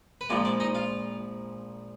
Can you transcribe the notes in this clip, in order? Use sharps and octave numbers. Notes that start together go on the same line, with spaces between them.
B4
A#1 A#2 F3 G#3 D4 D5
D4 D5
D#4 D#5
F4 F5